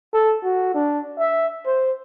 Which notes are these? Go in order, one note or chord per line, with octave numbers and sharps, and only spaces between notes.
A4
F#4
D4
E5
C5